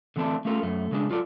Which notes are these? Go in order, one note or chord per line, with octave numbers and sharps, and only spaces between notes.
D3 E3 A3 C4 D4
A3 C#4 F4 A4 A#4
F#2 A3
C#3 G#3 D4
F#3 F4 A4 D5